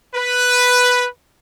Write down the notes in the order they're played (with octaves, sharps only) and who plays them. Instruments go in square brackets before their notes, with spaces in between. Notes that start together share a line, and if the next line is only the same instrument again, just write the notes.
[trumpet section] B4